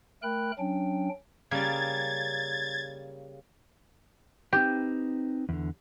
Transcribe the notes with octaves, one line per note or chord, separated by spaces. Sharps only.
A3 A#4 G5 B5 F#6
F#3 C#4 D4 G5
C#3 G3 A#3 G#6 A6
C4 D#4 G4 B4
E2 D3